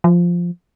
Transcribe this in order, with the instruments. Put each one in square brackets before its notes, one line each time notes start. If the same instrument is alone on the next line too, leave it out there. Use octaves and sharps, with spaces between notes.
[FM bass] F3